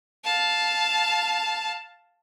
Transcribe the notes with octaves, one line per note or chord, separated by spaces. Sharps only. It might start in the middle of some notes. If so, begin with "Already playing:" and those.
F5 A5